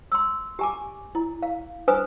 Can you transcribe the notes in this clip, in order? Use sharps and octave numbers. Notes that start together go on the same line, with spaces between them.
C6 E6
G4 G#5 D6
E4
F5
D4 B4 C5 G#5 D#6